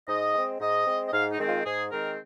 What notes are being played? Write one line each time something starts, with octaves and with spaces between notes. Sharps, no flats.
G#2 D#5
G#3 C4
G#2 D#5
G#3 C4
D#5
G#2 F5
D#4
D#3 G#3 C4
F4
G#2 G#4
D#3 G#3 C4 A#4